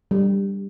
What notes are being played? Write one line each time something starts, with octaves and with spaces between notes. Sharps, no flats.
G3